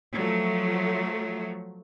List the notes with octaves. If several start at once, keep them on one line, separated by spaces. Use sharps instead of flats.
F3 F#3 A3